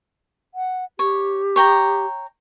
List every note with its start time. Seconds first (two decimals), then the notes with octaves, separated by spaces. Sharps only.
0.54 F#5
0.99 G4 C#5
1.56 C#5 G5 A#5